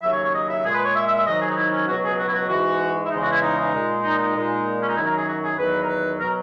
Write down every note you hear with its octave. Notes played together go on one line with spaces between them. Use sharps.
D#2 C#3 F#3 E5
C#5
C#5
D#5
E5
A#2 G#3 G#4
B4
C#5
E5
E5
E5
G#2 D#3 F#3 D#5
G#4
D#4
E4
C#4
C#2 B2 F#3 F#4
G#4
F#4
E4
F#4
G#2 E3 G#3 F#4
E4
E2 C#3 E3 G#3 D#4
F#4
E4
D#4
D#4
A#2 G#3
D#4
D#4
A#2 G#3
C#4
D#4
F#2 D#3 F#3 E4
A#4
G#4
F#4
G#4
E2 D#3 F#3 B4
A#4
B4
B2 F#3 A#4